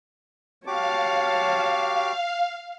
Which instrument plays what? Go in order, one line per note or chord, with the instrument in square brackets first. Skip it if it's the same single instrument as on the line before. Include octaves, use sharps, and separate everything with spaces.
[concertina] F#4 G4 D6 [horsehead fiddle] C#5 A5 [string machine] F5